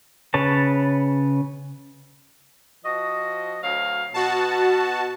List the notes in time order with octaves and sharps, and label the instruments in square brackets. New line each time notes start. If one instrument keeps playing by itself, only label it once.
[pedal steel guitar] C#3 B4 C#5 A5
[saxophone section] F3 F#4 D#5
D2 F#3 F5
[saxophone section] B2 [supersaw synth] F#4 A5